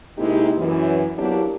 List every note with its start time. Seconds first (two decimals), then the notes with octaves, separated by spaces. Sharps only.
0.18 C3 G#3 A#3 D#4 E4 G4
0.57 F#2 E3
1.18 F#3 A#3 B3 D4 E4 G4